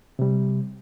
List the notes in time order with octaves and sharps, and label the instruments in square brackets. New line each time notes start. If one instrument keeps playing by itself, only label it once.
[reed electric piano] C3 G3